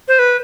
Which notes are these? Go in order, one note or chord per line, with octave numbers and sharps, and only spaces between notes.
C5
B4